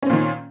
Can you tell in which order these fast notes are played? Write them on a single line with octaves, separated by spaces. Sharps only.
C#4 C4 A#2 D#3